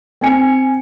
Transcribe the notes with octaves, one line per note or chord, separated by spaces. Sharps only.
C4 G#5 C#7